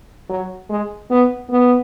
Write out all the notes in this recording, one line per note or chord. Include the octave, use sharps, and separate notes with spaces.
F#3
G#3
B3
B3